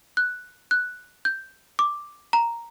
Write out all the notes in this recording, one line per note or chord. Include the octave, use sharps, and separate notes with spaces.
F#6
F#6
G6
D6
A#5